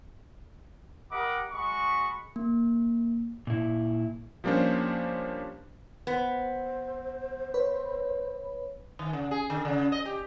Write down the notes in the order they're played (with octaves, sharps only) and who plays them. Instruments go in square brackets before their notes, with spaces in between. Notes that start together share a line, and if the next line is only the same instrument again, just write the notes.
[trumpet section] G4 A#4 D#5 F#5 B5 D6
G#3 F#4 D#5 B5 C#6
[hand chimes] A#3
[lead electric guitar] A#2 E4
[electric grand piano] F3 G3 A#3 C#4 D4 C5
[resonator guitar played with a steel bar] B3 [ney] C5
[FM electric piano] B4 C#5 B5
[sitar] D#3
C#3
G#4
D3
C#3
D#5
G4